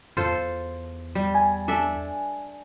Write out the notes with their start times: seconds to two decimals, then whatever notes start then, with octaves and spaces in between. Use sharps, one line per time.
0.17 E2 F4 A4 C5
1.15 G3
1.35 G#5
1.68 D4 A4 E5